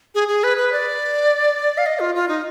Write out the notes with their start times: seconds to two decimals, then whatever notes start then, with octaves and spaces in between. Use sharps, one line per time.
0.15 G#4
0.28 G#4
0.44 B4
0.57 B4
0.72 D5
1.78 F5
1.86 D#5
2.00 F4
2.15 F4
2.29 D#4